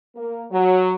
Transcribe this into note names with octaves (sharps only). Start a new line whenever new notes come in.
A#3
F#3